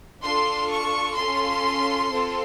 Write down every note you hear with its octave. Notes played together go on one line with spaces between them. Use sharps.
D4 F4 A4 C6
C#6
C#4 F4 A4 C6
C4 F4 A4